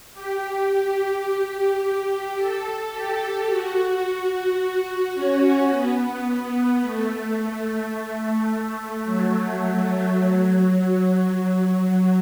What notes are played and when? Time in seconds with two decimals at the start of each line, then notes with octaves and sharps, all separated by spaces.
0.13 G4
1.24 G4
2.36 A4
2.91 G4
3.48 F#4
5.14 C#4
5.70 B3
6.82 A3
9.04 F#3
11.28 F#3